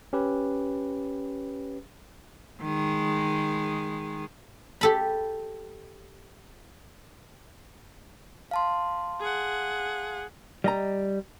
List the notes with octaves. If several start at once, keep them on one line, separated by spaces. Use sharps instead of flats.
C#4 G4 B4
D#3 G#3
G4 A4 B5
F5 A5 C6
G#4 F#5
G3 D#5 A#5